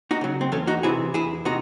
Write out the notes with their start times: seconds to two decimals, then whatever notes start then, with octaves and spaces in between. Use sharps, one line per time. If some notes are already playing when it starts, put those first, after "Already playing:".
0.11 D#4 F#4
0.21 C#3 F#3
0.41 C4
0.52 E2 A3 C#4
0.67 D#4 F#4
0.83 C3 E3 E4 G#4
1.14 E2 E4 G#4
1.45 C3 D#4 F#4